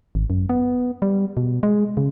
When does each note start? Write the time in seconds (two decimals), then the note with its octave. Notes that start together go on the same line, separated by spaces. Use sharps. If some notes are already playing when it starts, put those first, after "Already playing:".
0.15 G#1
0.30 F#2
0.49 B3
1.02 G3
1.37 B2
1.63 G#3
1.97 C#3